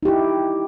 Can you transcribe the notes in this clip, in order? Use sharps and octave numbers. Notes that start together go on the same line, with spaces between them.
D#4 E4 G4